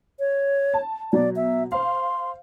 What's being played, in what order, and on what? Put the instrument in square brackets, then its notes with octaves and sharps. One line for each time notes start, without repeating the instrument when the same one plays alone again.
[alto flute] C#5
[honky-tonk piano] A5
[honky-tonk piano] B2 F#3 [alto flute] D5
[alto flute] E5
[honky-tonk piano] C5 F5 [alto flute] C6